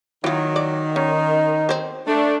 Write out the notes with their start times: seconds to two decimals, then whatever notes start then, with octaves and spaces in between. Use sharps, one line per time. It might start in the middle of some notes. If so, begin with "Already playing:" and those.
0.24 D#3 F#3 E4 F4
0.56 D5
0.96 C#4 D#4
1.69 C4 C5
2.07 A3 D4